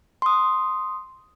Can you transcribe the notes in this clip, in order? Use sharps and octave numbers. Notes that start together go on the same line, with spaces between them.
C6 D#6